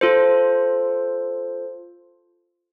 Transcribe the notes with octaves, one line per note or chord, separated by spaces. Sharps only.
F4 A4 C5